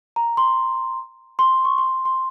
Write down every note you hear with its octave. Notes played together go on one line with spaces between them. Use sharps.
A#5
C6
C6
C#6
C6
C6